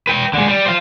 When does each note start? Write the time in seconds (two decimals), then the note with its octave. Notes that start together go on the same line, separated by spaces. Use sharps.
0.07 B4 G5
0.34 D3 G#3
0.47 G3
0.66 C5 F5